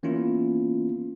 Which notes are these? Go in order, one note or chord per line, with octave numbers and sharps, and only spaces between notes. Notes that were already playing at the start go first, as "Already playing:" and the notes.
E3 A#3 B3 C#4 E4 F4